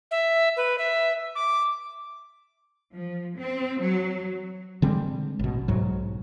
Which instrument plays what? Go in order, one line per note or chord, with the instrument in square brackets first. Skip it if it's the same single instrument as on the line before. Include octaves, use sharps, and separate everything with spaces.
[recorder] E5
B4
E5
D6
[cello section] F3
C4
F#3
[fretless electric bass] D3 G3 G#3 C4
A1 B2
B1 G#2 F#3